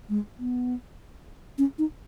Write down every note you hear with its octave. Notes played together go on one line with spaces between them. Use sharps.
G#3
B3
C#4
D#4